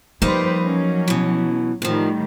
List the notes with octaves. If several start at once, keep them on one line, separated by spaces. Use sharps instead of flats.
F3 G3 A#3 D#4 B4 C5
F#3 C#4
B2 E3
F#2 A2 D#3 F3 G3